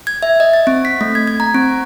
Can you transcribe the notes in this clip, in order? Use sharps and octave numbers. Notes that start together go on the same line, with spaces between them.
G#6
E5
D#5
A6
C4
B6
A3
G#6
G#6
A#5
C4